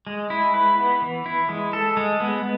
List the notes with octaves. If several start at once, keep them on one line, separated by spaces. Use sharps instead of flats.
G#3
E4
B4
B3
E3
E4
G#3
A4
G#3
B3